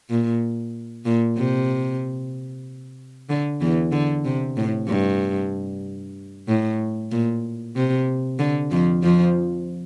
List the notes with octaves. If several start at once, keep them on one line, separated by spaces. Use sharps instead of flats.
A#2
A#2
C3
D3
E2 E3
D3
C3
A2
G2
A2
A#2
C3
D3
F2 F3
F2 F3